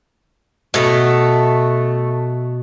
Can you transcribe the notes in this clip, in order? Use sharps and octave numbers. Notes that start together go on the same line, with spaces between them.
B2 A3 B4